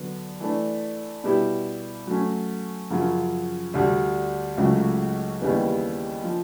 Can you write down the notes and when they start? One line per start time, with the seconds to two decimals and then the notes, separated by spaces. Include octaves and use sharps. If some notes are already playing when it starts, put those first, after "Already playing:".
Already playing: D3 F#3 B3
0.40 E3 A3 D4
1.24 B2 G3 B3 E4 G4
2.07 F#3 A3 C#4
2.90 F#2 C#3 F3
3.74 D2 D3 G3
4.58 C#2 C#3 F#3 A3
5.41 D#2 C#3 E3 G3 B3
6.24 F3